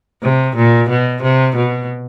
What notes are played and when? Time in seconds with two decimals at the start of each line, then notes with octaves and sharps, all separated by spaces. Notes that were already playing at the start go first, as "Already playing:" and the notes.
0.23 C3
0.56 A#2
0.89 B2
1.22 C3
1.56 B2